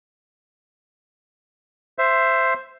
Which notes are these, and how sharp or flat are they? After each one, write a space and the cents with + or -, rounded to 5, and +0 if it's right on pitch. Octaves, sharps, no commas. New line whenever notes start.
C5 +0 E5 +15